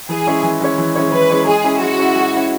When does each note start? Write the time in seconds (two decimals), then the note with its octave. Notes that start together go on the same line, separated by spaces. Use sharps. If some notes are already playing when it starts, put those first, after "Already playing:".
0.09 E3 G#4
0.27 G#3 C#4 E4 C#5
0.43 E3
0.61 G#3 C#4 E4 C#5
0.78 E3
0.95 G#3 C#4 E4 C#5
1.12 E3 B4
1.30 G#3 C#4 E4 C#5
1.47 G#3 G#4
1.64 C#4 E4
1.81 G#3 F#4
1.99 C#4 E4
2.16 G#3
2.33 C#4 E4